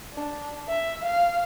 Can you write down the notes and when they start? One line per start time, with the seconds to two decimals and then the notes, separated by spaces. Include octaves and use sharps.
0.14 D4
0.68 E5
1.03 F5